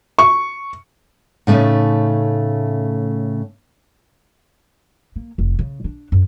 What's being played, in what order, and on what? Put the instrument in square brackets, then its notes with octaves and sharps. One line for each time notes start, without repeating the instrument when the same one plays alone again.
[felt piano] C#6
[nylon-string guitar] A2 C#3 A3 C#4 D#4
[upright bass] A#3
F1
C#3
D4
F#2